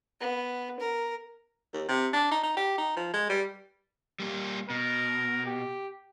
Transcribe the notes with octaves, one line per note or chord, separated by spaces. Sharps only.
B3
A#4
D#2
C3
D4
D#4
D#4
G4
D#4
F3
G#3
G3
G3 A#3 G4
B2 A#4
G4